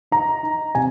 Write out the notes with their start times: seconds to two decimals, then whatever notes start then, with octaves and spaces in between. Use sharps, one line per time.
0.11 D#4 A#5
0.43 D#4
0.75 C3 G#5